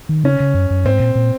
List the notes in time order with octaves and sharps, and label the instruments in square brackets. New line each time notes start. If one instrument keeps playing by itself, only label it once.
[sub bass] D#3
[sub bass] C#3 [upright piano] C#4
[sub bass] C#3
F#2
F#2
[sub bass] G#2 [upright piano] C4
[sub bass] A#2
A#2